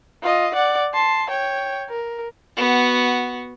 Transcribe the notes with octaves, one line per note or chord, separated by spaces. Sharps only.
F4 D#5
D5 F#5
A5 C6
C#5 G5
A#4
B3 F#4